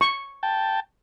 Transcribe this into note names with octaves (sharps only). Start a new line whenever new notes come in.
C#6
G5 A5